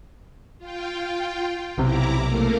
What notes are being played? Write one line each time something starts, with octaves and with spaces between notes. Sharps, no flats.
F4 G5
B1 C3 E4 A#5 D6
A3 A#3 A#4